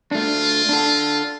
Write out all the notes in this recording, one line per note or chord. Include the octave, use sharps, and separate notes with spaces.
A3 D4 F4
D4 A4